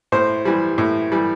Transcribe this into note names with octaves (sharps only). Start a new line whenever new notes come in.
A2 C5
E3 G3
A2
E3 G3